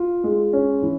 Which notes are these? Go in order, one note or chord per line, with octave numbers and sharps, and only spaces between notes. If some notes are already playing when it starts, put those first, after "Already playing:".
Already playing: F4
G#3
C#4
E3